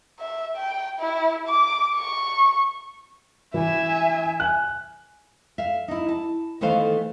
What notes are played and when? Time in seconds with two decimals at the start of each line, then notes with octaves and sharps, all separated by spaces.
0.20 E5
0.56 G5
1.00 E4
1.48 D6
1.95 C#6
3.54 E3 E5 G#5
4.40 G#5 F#6
5.58 E5 F5
5.88 D#4 E4
6.09 A5
6.61 D#3 E3 A3 B3 C5 F5